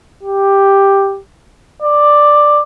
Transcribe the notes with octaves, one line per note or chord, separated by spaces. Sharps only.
G4
D5